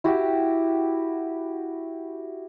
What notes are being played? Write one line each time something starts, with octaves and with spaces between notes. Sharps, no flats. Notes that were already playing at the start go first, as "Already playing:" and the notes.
E4 F#4 G4